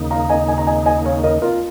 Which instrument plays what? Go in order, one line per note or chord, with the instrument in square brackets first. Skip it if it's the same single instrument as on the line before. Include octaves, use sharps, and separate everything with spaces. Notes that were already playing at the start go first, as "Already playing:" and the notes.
Already playing: [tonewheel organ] D#2 C#3 A#3 D#4
[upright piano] F5 A#5
D#5 G#5
D#5 G#5
A#5
D#5 G#5
D#5 G#5
C#5 F5
A#4 D#5
F4 A#4